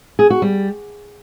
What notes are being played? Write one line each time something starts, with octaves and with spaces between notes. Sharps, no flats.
G#4
F#4
G3